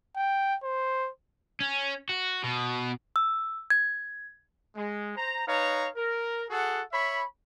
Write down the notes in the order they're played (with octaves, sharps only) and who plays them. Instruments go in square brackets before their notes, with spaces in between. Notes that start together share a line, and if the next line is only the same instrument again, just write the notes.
[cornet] G5
C5
[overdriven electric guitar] C#4
F#4
B2
[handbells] E6
G#6
[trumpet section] G#3
C5 A#5
D#4 B4 C#5 F5 A#5
A#4
F#4 G#4 A4 F#5
C#5 E5 B5